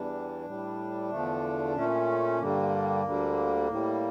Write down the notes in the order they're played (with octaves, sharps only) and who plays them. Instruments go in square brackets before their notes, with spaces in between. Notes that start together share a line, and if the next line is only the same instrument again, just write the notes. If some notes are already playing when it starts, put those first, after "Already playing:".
Already playing: [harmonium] E2 E3 G3 D4
A2 G3
E2 D3 F3 A3
A#2 A3 C#4
G2 D3 G3 A#3
D2 D3 G3
A2 G3